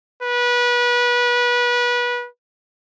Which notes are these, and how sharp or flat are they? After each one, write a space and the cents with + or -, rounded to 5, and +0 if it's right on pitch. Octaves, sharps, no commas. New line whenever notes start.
B4 -25